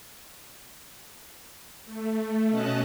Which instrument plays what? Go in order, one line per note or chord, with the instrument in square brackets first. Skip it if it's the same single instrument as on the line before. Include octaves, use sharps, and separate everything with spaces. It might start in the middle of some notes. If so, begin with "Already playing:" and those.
[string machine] A3
B2 C#4 D#5 A5 F#6